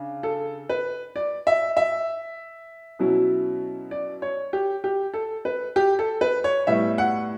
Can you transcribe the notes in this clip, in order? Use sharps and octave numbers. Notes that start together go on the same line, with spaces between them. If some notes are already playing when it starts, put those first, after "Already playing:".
Already playing: C#3 D4
A4
B4
D5
E5
E5
B2 F#3 C#4 E4
D5
C#5
G4
G4
A4
B4
G4
A4
B4
C#5
A2 G3 B3 E5
F#5